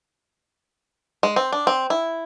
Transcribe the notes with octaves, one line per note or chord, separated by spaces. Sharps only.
G#3
C4
D4
C4
E4